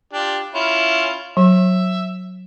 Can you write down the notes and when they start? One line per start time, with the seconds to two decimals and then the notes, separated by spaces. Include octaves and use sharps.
0.13 D4 F4 G4
0.55 C#4 E4 F4
1.37 F#3 E5